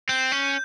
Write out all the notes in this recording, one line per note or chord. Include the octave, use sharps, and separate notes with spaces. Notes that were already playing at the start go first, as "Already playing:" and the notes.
C4 G6
C#4